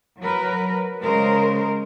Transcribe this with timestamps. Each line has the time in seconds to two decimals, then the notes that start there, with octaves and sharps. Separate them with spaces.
0.21 F#3 A#4 B4
1.01 C#3 G#3 A#4 C5